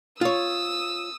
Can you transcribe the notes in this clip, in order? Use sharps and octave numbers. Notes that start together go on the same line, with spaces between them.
F4 C#5 D#6 E6